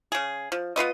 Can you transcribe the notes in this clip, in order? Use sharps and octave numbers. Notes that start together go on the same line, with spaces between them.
C#3 G#4
F3
B3 F4 B4 D#5